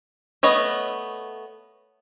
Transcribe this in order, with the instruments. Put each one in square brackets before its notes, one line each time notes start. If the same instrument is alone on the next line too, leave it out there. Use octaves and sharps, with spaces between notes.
[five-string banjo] A3 B3 C#5 D#5